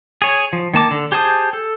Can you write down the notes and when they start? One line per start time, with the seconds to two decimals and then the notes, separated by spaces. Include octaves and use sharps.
0.22 G#4 C#5
0.53 F3
0.73 D#3 A#3 A5 D6
0.91 D3
1.12 G4 G#4 C5 A5 D#6
1.53 A4